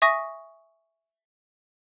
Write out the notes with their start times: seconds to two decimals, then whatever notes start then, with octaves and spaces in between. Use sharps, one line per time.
0.02 E5 G#5 C#6 D#6 A#6